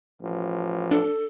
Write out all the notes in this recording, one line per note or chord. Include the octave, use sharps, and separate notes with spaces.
A1 F3
D4 A4